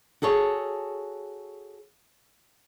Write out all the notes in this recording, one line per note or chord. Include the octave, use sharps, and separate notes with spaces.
F#4 G#4 A4 C#5